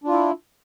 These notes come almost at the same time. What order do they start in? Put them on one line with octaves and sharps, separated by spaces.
D4 F4 E4